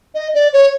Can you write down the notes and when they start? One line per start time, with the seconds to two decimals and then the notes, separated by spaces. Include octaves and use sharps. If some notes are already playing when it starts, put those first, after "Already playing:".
0.14 D#5
0.34 D5
0.53 C#5